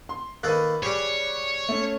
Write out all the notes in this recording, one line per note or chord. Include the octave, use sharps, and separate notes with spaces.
C6
D#3 A#3 A4 B4 F#6
G3 G4 G#4 C#5
A3 C#4